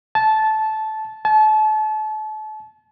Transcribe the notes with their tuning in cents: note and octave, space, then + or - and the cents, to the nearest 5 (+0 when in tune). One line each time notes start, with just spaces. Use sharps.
A5 -15
A5 -35